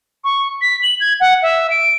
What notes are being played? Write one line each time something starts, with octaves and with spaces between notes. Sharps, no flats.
C#6
B6
F#7
G#6
F#5
E5
D7